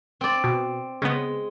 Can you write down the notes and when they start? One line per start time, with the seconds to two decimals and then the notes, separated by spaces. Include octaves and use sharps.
0.21 C4 D5
0.44 B2
1.02 C#3 G#3 B3